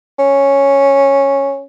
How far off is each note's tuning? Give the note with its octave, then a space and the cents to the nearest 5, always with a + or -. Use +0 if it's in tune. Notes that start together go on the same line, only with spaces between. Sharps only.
C#4 -5